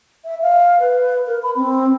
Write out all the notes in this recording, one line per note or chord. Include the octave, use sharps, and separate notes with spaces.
E5
F5
B4
A#4
B5
C4